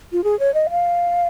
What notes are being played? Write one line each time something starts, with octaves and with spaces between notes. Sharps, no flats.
F4
G#4
C#5
D#5
F5